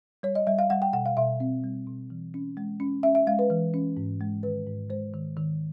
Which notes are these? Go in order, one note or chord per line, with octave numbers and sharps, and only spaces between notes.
G3 C#5
D#5
G3 E5
F5
G3 F#5
G5
B2 F#5
F5
B2 E5
C4
G3
B2
E3
C#4
G#3
C#4
C#4 E5
E5
G#3 F5
B4
E3
C#4
G#2
G#3
D#3 B4
G#2
G#3 C5
D#3
D#3